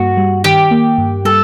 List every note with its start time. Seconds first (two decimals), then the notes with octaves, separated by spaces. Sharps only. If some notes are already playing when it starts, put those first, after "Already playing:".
Already playing: G2 A#3 F#4
0.17 G3
0.44 D#3 G4
0.71 A#3
0.98 G2
1.25 G3 A4